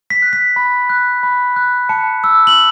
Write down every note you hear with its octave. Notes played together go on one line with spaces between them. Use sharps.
B6
F#6
B6
B5
F#6
B5
F#6
A5 C#7
E6
F#7